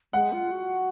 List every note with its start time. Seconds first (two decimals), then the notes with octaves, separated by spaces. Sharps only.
0.13 G#3 F#5
0.33 F4
0.52 F#4